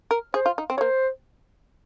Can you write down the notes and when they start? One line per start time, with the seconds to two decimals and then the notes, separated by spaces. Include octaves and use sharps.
0.11 A#4
0.34 G#4 C5
0.46 F4
0.58 D#4
0.70 C4
0.77 G#3 C#5
0.81 A#3 C5